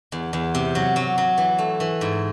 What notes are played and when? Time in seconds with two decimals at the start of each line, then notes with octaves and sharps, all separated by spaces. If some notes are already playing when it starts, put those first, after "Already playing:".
0.12 E2
0.33 E2
0.55 C3
0.75 F#3
0.96 F#3
1.18 F#3
1.38 E3
1.59 A3
1.80 E3
2.01 G#2